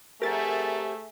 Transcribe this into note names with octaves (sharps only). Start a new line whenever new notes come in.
A3 G4 G#4 A#4 C5 E5 F#5 A6